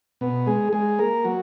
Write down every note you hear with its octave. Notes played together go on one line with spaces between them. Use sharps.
B2 B3
G#3 G#4
G#3 G#4
A#3 A#4
F#3 F#4